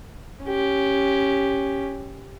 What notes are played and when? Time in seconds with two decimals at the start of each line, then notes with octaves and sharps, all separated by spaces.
0.44 C#4 G4